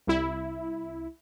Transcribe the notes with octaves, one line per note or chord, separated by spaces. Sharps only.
C2 E4